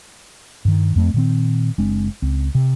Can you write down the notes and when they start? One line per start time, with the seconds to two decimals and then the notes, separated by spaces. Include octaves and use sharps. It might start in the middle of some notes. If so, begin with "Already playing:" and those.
0.65 G2 D#3
0.96 F2 A3 C4
1.14 A#2 D#3 C4
1.78 F#1 G#3 C4 D4
2.22 C#2 C4
2.55 C3